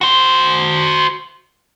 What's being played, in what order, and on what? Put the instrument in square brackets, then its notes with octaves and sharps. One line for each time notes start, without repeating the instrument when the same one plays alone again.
[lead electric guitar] F#4 C5